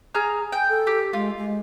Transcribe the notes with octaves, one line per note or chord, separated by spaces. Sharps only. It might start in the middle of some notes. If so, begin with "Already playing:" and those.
G#4 A#5 F6
G5 G#5
A4
G4
G#3 F4
G#3